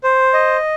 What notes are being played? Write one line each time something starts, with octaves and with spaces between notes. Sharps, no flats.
C5
D#5